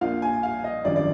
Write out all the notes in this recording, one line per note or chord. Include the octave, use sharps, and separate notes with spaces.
A#1 A#2 F3 F5
G#5
F5
D#5
G#1 F#2 D3 F3 D5
D5